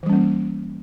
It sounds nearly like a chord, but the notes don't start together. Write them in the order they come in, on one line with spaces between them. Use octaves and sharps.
E3 G3 C#4 A#3